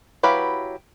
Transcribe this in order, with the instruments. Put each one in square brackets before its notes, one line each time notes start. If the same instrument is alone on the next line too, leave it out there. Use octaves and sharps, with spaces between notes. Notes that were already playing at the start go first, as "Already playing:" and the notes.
[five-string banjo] F#3 E4 G4 B4 F5